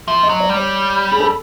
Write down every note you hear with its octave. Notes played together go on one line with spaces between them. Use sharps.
F3 E5
D#5
F#3
D5
G3
C#5
G#4
A4